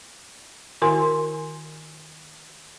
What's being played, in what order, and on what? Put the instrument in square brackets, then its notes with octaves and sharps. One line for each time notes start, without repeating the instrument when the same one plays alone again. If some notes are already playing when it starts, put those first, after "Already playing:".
[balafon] D#3 E4 F#4 A#4 G#5 C6